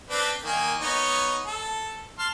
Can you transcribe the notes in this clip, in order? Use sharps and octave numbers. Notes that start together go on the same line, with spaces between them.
C4 D4 B4
D#3 A#3 G#5
B3 D#4 C#5
A4
A5 C6 F6